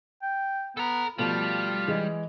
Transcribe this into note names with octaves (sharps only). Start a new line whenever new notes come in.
G5
B3 A4 A#5
B2 F3 G3 A3 F4
E3 G#3 G#4